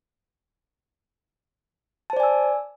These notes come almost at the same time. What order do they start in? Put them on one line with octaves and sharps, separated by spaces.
A5 C5 D5 G#5 E6